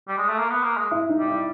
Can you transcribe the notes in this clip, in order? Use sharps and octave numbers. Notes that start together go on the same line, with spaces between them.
G3
G#3
A3
A#3
B3
A#3
G#3
E4
D#4
G3
E4